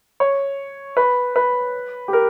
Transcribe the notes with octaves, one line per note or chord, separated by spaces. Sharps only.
C#5
B4
B4
G4
A#4